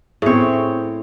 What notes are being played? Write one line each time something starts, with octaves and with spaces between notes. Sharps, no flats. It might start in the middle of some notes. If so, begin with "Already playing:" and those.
A2 C4 G#4 C#5